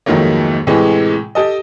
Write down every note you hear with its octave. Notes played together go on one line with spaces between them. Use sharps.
F2 G#2 D#3 F#3 A3 A#3
A2 C3 E3 G#3
G4 A4 D#5